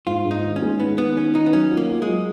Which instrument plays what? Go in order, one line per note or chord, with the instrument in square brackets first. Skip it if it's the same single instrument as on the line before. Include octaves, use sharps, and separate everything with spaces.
[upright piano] G#2 [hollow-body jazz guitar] F4
[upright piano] G#2
[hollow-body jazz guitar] D#4
[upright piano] D#3
[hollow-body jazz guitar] C#4
[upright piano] G#3
[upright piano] D#3 [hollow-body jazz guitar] B3
[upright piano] D#3 [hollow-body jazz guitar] B3
[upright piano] D#3 [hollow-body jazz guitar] C#4
[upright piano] D#3 [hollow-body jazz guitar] D#4
[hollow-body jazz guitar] B3
[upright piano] F#3 [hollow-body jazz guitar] C#4
[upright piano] F4
[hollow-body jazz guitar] A#3
[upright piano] F4
[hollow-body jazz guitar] G#3
[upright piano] F#3